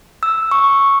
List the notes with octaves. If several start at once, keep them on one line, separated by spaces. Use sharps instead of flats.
E6
C#6